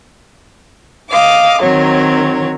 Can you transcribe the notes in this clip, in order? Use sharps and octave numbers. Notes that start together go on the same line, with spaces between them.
D#5 F5 D6
D#3 F#3 C4 C#5